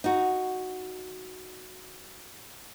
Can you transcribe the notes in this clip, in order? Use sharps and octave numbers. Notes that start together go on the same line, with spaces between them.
D#4 F#4